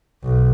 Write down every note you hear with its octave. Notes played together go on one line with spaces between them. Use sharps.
B1